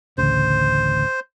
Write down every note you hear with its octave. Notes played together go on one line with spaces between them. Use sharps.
A1 D2 C#3 C5